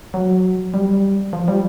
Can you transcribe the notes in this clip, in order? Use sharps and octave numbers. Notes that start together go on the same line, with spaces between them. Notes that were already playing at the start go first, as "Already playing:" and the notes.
F#3
G3
F3
G3